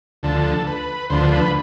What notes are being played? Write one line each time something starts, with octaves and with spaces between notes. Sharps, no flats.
D2 D3 F3 A4
B4
D2 D3 F3 C5
B4